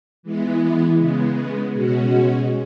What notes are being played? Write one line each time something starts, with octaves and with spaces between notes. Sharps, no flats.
E3 G#3 B3 E4
C#3 G#3 B3
B2 G#3 C#4 F#4